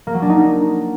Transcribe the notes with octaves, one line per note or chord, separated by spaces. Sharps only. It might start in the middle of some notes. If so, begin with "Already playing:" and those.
A#3
F#3
D4
D#4